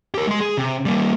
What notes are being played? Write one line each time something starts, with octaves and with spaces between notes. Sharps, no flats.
G4 A#4
G#3 C6
G#4
C3
G3 A#3